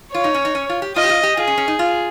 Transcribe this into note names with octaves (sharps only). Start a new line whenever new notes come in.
F4 C#5
D#4
C#4
D#4
C#4
F4
G4
F4 D#5
G4
F4
G4
F4 G#4
C#4
C#4
D#4
F4